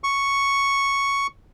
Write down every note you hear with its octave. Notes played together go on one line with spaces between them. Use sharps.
C#6